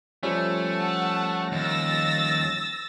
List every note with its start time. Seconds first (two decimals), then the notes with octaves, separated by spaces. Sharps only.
0.23 F3 G3 A3 C#4
0.78 F#5 A5
1.52 D#2 E6 A6 A#6